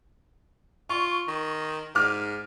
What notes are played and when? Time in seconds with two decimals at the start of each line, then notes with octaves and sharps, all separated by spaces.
0.89 F4 C#6
1.28 D#3
1.95 G#2 D6 F6